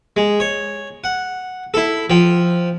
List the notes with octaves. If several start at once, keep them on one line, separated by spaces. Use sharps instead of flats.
G#3
C#5
F#5
E4 A4
F3 G5